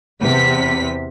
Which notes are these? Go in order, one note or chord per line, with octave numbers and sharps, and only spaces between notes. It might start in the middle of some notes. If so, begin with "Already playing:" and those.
E2 C3 B6